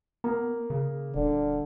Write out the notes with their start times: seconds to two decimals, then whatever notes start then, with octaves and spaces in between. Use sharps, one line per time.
0.24 A#3 B3
0.70 C#3
1.15 D#1 D3